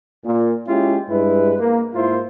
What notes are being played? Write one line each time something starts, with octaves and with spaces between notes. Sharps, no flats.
A#2
G#3 C#4 E4 F4 G4
G2 G#3 E4 B4
A#3
G#2 A#3 E4 F4 C5